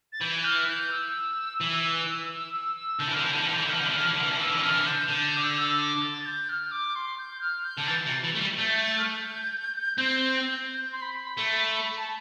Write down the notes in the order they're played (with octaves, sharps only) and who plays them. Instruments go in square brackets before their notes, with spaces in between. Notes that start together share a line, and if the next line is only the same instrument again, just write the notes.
[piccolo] A6
[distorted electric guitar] E3 [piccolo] G6
[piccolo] F6
G6
E6
[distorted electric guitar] E3
[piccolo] E6
E6
E6
[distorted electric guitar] D3 [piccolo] G6
[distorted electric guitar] E3
[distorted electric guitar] D3 [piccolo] F6
[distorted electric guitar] E3 [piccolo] G6
[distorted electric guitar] D3
E3
D3
[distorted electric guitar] E3 [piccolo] G6
[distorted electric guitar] D3
[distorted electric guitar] E3 [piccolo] F6
[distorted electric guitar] D3
E3
[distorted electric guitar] D3 [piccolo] F6
[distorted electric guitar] E3
[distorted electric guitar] D3 [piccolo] F6
[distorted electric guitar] E3
D3
[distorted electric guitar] E3 [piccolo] E6
[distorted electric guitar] D3
E3
[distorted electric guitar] D3 [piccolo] F6
[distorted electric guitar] E3
D3
[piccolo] G6
[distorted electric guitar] D3 [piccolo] G6
[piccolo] G6
D6
E6
E6
D6
A6
A6
G6
F6
D6
C6
G6
F6
G6
[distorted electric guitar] D3
[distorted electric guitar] E3 [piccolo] A6
[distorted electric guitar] C3
E3
A3
G3
[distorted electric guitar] A3 [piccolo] G6
[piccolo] A6
F6
G6
[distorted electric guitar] C4
[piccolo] G6
C6
B5
[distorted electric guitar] A3
[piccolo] A5